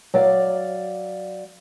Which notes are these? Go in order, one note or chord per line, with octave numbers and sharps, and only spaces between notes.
F#3 D5 F5